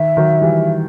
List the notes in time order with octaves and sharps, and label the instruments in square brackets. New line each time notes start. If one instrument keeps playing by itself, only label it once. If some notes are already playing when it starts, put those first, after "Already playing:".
Already playing: [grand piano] D#3 [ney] E5
[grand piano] D#3 F#3
E3 G3